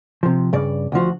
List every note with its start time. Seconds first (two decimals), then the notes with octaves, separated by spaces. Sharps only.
0.23 C3 F3
0.53 G2 C#3 D5
0.92 D2 D3 F3 F#4